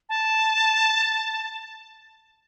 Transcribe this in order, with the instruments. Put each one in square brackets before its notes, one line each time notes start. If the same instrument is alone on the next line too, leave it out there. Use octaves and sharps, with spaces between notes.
[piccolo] A5